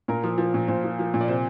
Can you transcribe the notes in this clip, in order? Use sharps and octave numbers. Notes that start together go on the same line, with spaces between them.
A#2 A#4
F3
F3
A#2
A#2 C5
F3
F3
A#2
D5
C3 C5